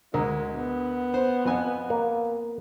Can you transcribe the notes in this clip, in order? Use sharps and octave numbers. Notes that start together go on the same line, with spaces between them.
D2 G#3 A#4
B3
C5
F2 B4 G#5
A#3